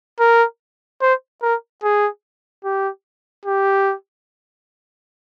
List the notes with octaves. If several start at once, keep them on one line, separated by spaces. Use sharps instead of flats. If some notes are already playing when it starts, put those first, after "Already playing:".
A#4
C5
A#4
G#4
G4
G4